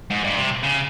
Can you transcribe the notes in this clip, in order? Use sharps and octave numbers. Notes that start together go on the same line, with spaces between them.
G#2
G2
C3
C#3